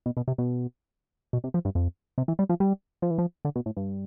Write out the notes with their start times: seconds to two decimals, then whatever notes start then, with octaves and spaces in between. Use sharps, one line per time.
0.06 B2
0.17 B2
0.28 C3
0.38 B2
1.33 B2
1.44 C3
1.54 F3
1.65 G2
1.75 F2
2.18 C3
2.28 E3
2.39 G3
2.49 F3
2.60 G3
3.02 F3
3.10 E3
3.18 F3
3.45 D3
3.56 B2
3.66 A2
3.77 G2